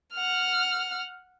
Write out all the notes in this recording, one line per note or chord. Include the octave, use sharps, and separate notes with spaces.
F#5 F6